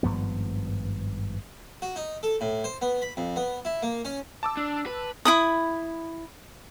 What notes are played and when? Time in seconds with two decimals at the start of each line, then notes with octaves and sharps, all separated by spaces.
0.03 G#1 G2 F3 B3
1.82 F#4
1.96 D#4
2.23 A4
2.41 A2
2.64 C5
2.82 B3
3.02 B5
3.17 F2
3.36 B3
3.65 E4
3.82 A#3
4.05 C#4
4.43 A5 D6 E6
4.57 D4
4.86 B4
5.25 E4 B5 D#6